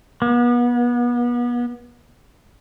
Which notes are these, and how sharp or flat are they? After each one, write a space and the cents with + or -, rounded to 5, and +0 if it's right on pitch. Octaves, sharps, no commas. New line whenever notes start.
B3 -35